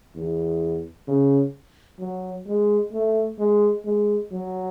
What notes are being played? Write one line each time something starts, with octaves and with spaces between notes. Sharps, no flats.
E2
C#3
F#3
G#3
A3
G#3
G#3
F#3